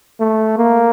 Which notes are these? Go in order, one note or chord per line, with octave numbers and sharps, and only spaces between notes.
A3
A#3